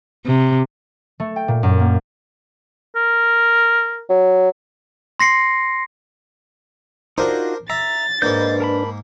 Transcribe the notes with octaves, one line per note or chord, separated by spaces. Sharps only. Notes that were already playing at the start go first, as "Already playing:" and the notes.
C3
A3
G5
A#2
F#2
A#3
A#4
F#3
C6 A#6 C7 C#7
D4 D#4 F4 F#4 A#4 C5
E5 A#5 A6
G#2 A#3 D4 B4 D#5 G6
A#4 A5 B5